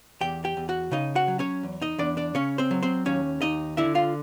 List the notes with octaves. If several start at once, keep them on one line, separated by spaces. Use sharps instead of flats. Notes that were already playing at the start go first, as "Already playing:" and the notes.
E2 G4 G5
G4 G5
E2
F#4 F#5
C#3 D#4 D#5
F#4 F#5
F#3
C#4 C#5
E2
D#4 D#5
E2 D4 D5
D4 D5
C#3 C#4 C#5
C4 C5
F#3
C4 C5
D#2 C#4 C#5
D#2 D#4 D#5
D3 E4 E5
F4 F5